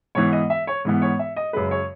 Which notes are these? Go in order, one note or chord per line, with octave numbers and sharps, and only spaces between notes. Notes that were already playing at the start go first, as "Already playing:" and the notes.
G#2 E3 B3 C#5
D#5
E5
C#5
G#2 E3 B3
C#5
E5
D#5
F#2 C#3 G#3 B4
C#5